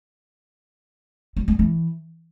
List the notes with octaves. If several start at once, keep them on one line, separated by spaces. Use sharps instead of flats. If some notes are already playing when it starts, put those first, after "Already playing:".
F#3
G3
E3